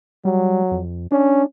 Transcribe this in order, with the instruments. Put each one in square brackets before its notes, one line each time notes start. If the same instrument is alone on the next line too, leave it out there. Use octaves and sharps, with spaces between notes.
[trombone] F#3 [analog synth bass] G3
[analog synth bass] F2
[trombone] C#4 [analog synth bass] D4